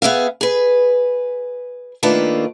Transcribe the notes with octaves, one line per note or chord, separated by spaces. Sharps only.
B3 G#4 E5 F5
G#4 B4
D#3 A3 A#3 D4 F4 B4